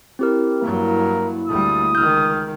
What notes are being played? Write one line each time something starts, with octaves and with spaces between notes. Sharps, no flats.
C4 E4 G4 A#4
G2 F#3 A#3 A#4
D2 G3 D#6
C#2 D#3 F6 G6